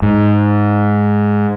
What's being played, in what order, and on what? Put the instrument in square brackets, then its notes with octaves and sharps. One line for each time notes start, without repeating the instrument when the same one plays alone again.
[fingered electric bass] G#2